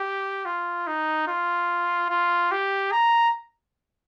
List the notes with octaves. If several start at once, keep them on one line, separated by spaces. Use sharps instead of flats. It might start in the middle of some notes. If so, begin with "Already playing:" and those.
Already playing: G4
F4
D#4
F4
F4
G4
A#5